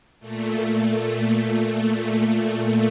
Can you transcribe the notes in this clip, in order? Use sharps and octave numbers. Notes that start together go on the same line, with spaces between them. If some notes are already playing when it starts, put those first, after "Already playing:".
A#2 A3